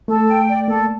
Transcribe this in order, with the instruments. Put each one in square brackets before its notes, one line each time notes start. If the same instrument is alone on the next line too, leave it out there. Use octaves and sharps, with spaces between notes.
[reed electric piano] A3 [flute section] A4
[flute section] G5
D5
[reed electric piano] A#3 [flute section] A4